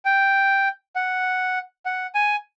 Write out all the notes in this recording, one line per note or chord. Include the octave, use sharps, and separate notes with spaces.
G5
F#5
F#5
G#5